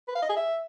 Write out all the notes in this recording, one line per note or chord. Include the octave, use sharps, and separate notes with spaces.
B4
F5
D#5
G#4
E5